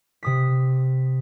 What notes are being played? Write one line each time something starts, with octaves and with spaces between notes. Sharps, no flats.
C3 D#6 B6